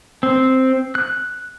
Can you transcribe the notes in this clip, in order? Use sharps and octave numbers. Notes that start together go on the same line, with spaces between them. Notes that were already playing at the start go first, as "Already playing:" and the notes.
C4
F#6